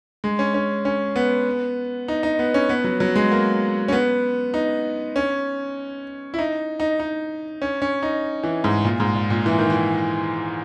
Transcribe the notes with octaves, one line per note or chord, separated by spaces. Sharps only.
G#3
C#4
C#4
C#4
B3
D#4
D#4
B3
C#4
B3
F#3
F#3
G#3
A#3
C#4
B3
D#4
C#4
E4
D#4
D#4
D#4
C#4
C#4
D#4
E3
G#2
A#2
G#2
A#2
A#2
E3
D#3
E3